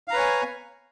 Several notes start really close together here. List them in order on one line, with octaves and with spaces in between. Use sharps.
F5 A#5 B4 C#5 G#5